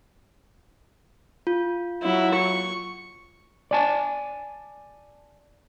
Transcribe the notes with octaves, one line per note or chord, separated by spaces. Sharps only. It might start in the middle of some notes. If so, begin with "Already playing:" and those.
F4
F#3 E4
C#6
D5 G#5 A5